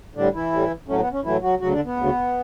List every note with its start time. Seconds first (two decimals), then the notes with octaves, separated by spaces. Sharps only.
0.15 A2 D3 G3 D4
0.34 E3 E4
0.52 A2 G3
0.88 A2 F#3 A3 C#4
1.00 B3
1.12 C#4
1.24 A2 E3 F#3 A3 E4
1.42 F#3 F#4
1.60 D2 C#3 F#3 F#4
1.72 D3 D4
1.85 B3
1.96 D2 C#3 F#3